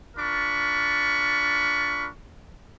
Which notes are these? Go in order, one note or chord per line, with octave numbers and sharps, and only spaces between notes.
D4 F4 A#4 B5 C#6